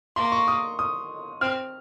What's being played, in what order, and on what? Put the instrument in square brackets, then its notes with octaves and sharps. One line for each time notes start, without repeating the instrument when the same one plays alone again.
[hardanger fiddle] A#3 [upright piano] C6
[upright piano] C#6
D#6
D#6
[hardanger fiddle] C4 [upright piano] F6